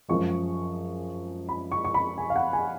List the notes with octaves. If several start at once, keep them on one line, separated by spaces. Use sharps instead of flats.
F#2 F3 G#3 C#6
B5
C#6
C#6
B5
G#5
F5
F#5
G#5